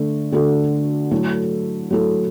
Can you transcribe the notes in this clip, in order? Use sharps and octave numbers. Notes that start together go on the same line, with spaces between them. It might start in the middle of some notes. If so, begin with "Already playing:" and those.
Already playing: D3 A3
D3 A3 F#4 A4
F#3 A3 E4 A4
F#3 A3 E4 A4